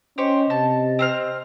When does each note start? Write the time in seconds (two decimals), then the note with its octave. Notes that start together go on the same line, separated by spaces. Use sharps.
0.18 C#4 G4 C5 D#5 C#6
0.50 C3 A5
0.99 C4 C5 F6